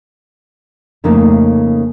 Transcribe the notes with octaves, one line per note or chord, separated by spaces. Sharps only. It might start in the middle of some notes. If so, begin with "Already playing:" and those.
F2 C#3 A3 A#3 D#4